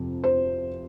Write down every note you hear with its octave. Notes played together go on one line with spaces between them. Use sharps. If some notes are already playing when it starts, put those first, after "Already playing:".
Already playing: F2 C3 F3
C5